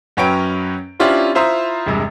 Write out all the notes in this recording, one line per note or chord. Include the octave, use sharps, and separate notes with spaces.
F#2 F#3 C#4 B4 G5 D7
C#4 D4 E4 F4 G4 C5
E4 F4 C5 E5 A#5 D#6
E1 G2 C3 G#3